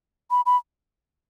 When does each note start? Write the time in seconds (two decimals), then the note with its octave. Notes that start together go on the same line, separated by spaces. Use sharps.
0.31 B5
0.46 B5